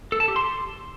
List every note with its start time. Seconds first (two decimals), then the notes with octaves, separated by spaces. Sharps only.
0.12 A4
0.20 A5
0.28 G4
0.36 C6